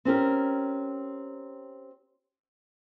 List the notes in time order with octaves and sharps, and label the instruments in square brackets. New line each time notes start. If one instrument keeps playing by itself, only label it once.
[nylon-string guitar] C4 C#4 G4 A#4